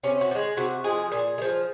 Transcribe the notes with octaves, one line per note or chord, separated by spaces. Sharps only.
C3 C#4
F#4
F3
G#3
C3 F#4
F3 G#3 G#4
A#2 G#4
G#3
F3